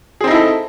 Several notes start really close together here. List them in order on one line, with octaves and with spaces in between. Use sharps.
G#4 C4 D#4 E4 A4